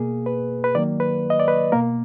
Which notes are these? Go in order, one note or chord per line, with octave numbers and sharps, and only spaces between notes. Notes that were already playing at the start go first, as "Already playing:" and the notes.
Already playing: B2 A#3 G#4
B4
B4
D#3 F#3 A#3 D5
B4
D#5
D5
B4
B2 A#3 A#4